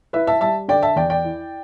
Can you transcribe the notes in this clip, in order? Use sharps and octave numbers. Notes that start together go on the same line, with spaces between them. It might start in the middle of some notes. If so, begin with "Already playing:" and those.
E4 B4 E5
E5 A5
G3 E5 A5
D3 D5 G5
E5 A5
E2 D5 G5
D5 G5
E4